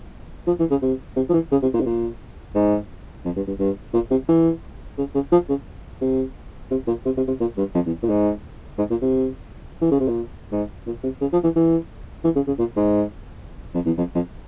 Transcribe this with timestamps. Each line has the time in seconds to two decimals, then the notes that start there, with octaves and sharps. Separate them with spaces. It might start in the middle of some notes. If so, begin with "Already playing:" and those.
0.47 F3
0.59 E3
0.71 C#3
0.82 C3
1.16 C3
1.29 F3
1.33 E3
1.52 C#3
1.62 C3
1.74 A#2
1.81 C3
1.86 A#2
2.55 G#2
3.25 F2
3.36 G2
3.47 G2
3.59 G2
3.94 A#2
4.11 C3
4.29 E3
4.98 C#3
5.15 C#3
5.32 F3
5.49 C#3
6.01 C3
6.71 C3
6.87 A#2
7.05 C3
7.17 C3
7.28 C3
7.40 A#2
7.58 G2
7.74 F2
7.86 E2
8.03 A#2
8.09 G#2
8.78 G#2
8.90 A#2
9.02 C3
9.82 E3
9.91 C#3
10.00 C3
10.08 A#2
10.52 G#2
10.86 A#2
11.03 C3
11.21 C#3
11.33 F3
11.44 E3
11.56 E3
12.24 E3
12.35 C#3
12.47 C#3
12.59 A#2
12.77 G#2
13.75 F2
13.86 E2
13.98 F2
14.15 F2